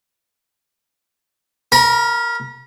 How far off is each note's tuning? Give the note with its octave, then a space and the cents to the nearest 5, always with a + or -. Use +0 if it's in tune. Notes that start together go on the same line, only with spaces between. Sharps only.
A#4 +0 B5 -40